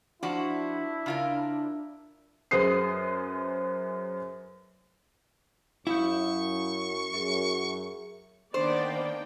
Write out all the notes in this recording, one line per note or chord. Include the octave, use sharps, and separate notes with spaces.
F3 D4 E4 F#4
C#3 F4 A#4
F#2 G#4 B4 C5 D#6 C7
F#2 E4 F5 C#6 D#6 G6
F#2 G#4 A#4 E5
D#3 A#3 B3 D4 C5 D5 G5